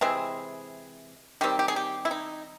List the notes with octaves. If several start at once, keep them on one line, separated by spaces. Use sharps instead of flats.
C3 E3 G#3 C4 G#4
D#3 G3 C4 G4
G4
G#4
G4
E4
D#4